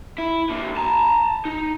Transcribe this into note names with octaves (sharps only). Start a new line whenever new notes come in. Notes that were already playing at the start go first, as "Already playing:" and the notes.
E4
D3 A#3
A5 A#5
D#4